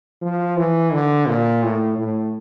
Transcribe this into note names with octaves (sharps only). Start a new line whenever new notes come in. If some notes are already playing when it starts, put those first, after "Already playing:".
F3
E3
D3
A#2
A2
A2